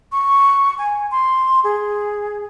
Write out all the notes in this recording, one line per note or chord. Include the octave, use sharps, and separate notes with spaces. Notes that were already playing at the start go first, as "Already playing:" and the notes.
C#6
G#5
C6
G#4